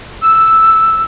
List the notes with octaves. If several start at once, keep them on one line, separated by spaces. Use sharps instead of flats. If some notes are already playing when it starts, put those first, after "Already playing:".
E6